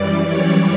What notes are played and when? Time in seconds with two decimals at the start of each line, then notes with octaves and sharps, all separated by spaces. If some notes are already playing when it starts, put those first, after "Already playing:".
Already playing: F#2 E3 G3 D5
0.27 C#5